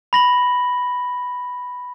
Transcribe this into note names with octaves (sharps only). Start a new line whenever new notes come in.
B5 A#6 F#7